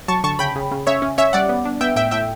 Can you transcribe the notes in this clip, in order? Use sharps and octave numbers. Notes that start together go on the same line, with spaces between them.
F#3 A5 C#6
D3 A5 C#6
C#3 G5 B5
C#3
C#3
C#3 C#5 E5
C#4
C#4 C#5 E5
G3 D5 F#5
B3
D4
B3 E5 G5
A2 E5 G5
A2 E5 G5